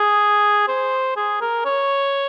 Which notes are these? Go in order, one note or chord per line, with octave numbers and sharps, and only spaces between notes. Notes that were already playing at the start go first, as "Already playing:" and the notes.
Already playing: G#4
C5
G#4
A#4
C#5